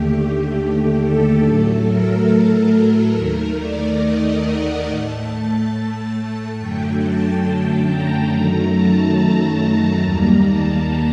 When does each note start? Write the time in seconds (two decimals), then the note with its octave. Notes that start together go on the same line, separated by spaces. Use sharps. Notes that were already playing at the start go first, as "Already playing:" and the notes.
Already playing: D#2 D3 A3 G4
1.01 A4
1.44 A2 F#3 A3
1.87 A#4
3.16 D#2 D#3 A3
3.59 D5
4.02 D#5
4.45 F#5
4.88 A2 A3 A5
5.73 A5
6.59 F#2 D3 F#3 A3 G5
7.03 A5
7.89 A#5
8.32 F#2 D#3 F#3 A3
8.75 A5
9.18 A5
9.60 A5
10.03 D#2 D#3 G3 A#3 A#5
10.47 A5